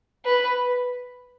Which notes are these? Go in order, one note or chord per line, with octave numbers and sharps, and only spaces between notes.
B4